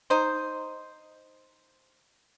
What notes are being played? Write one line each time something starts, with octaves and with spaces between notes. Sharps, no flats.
D#4 C5